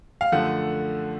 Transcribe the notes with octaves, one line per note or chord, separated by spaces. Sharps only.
F5
F#2 D3 F3 A3 F#5